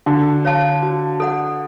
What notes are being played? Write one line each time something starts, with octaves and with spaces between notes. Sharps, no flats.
D3 F#4
C#5 F5 A5
F#4
A4 D5 F#5